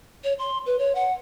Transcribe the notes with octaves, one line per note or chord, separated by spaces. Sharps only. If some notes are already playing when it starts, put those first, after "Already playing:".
C#5
C6
B4
C#5
F#5